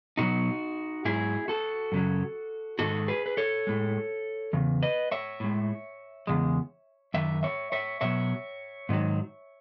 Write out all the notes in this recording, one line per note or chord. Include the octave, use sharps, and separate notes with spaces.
B2 F#3 D#4 F#4
G#2 F#3 E4 G#4
F#4 A4
F#2 C#3 F#3
G#2 D#3 G#3 F#4 A4
G#4 B4
B4
A4 C#5
A2 G#3
E2 C#3
B4 D#5
C#5 E5
A2 G#3
E2 C#3 G#3
F#2 D#3 E5
C#5 E5
C#5 E5
B2 F#3 C#5 E5
G#2 D#3 F#3